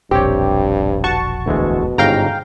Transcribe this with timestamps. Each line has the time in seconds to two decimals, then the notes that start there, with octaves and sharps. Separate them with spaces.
0.11 E1 A#1 G2 C4 G4 C#5
1.04 F#4 A5 C#6
1.46 D2 B2 E3 G#3
1.98 G1 G#2 C#3 F5 G5 A#5